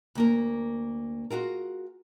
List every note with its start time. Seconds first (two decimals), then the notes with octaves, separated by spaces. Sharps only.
0.15 D2 A#3 A#4
1.30 F4 F#4 G#4 A#4